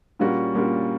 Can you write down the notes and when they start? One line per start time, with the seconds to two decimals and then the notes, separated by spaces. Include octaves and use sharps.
0.19 A#2 G3 A#3 C#4 F#4
0.54 A#2 G3 A#3 C#4 F#4